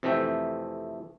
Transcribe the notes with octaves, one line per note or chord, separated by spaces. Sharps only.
F2 C3 E3 A3 E5 G5